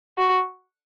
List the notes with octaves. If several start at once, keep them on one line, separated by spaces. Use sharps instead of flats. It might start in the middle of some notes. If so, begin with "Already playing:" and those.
F#4